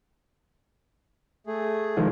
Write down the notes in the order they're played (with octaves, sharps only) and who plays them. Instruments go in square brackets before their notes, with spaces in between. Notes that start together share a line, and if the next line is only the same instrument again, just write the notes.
[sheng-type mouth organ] A3 G#4
[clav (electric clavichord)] D#3 F3 G#3